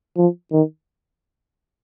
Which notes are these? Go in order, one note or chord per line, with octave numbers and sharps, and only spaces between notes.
F3
D#3